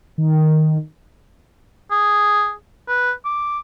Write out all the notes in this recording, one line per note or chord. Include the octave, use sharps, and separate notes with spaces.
D#3
G#4
B4
D6